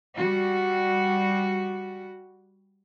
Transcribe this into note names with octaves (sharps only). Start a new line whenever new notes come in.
G3 F#4